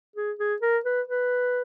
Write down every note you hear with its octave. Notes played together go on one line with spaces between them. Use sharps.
G#4
G#4
A#4
B4
B4